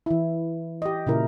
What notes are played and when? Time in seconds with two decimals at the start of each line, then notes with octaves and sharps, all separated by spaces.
0.06 E3 E4
0.82 G4 D#5
1.07 A#2 C#3 E4 A#4